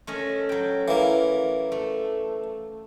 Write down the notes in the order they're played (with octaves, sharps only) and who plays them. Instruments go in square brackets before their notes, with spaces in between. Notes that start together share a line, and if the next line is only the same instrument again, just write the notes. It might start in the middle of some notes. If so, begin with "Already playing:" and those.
[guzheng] A3 C#4 D#5
F#3 G5
[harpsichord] E3 A#3
[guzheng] A3